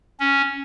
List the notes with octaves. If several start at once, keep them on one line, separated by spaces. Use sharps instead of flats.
C#4